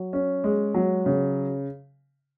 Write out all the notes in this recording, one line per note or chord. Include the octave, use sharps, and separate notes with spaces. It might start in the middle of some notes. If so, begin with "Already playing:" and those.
Already playing: F#3
C#4
G#3
F#3
C#3